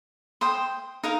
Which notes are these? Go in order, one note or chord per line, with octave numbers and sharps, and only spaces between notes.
C5 G5 C6 D#6
D#4 A#4 F5